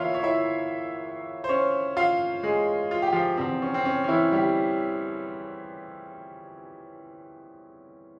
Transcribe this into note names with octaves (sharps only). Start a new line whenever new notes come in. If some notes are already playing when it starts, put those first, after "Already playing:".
Already playing: E2 E3 A#3 E4 F4 C#5 E5 F5
C#5
E4 E5
C5
C#4 C#5
F4 F5
G#3 G#4
F4
G4
F3 F4
E2 C3 F3 C4
C#4
C4
C#4
C#4
E3 E4
G3 G4